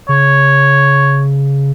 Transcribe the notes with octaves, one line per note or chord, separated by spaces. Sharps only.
C#3 C#5